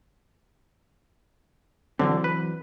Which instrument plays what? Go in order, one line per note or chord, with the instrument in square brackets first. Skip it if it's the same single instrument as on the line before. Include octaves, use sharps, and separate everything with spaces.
[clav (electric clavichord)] D3 [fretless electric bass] E3 F#3 C4
[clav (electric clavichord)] B4